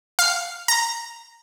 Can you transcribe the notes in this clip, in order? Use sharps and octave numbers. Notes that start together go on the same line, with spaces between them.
F5
A#5